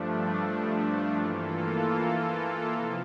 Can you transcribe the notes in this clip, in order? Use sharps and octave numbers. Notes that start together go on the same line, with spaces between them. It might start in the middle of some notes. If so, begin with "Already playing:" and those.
Already playing: G2 F3 A3 D4
E3 A#3 F4 A4
C3 F3